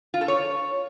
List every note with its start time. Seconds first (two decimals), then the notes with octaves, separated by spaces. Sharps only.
0.14 F4
0.21 A4
0.28 C#5